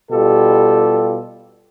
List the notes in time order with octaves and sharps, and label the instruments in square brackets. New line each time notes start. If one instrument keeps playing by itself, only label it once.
[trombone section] B2 G3 F4 G4 A4